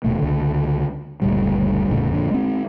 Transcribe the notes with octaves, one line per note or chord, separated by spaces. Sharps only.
D#1 B2 A3
C#2 D3
F#1 D2 A#2 G3
E1 A2 C#3 A3
F2 A#2 D3
G#3 C4